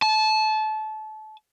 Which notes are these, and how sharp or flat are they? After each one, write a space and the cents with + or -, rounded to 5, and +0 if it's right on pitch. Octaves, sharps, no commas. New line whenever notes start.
A5 -25